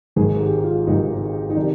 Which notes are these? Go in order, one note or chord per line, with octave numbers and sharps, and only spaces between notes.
G#1 G#2 D#3 G#4
G4
F4
G#1 G#2 D#3 D#4
D#4
C3 D#3 D4